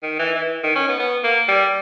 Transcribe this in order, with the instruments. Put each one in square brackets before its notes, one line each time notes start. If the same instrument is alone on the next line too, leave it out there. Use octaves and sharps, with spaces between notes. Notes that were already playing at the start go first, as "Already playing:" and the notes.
[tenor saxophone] D#3
E3
E3
D#3
C#4
B3
B3
A#3
G3